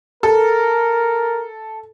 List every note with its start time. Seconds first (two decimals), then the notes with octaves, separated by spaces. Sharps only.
0.23 A4 A#4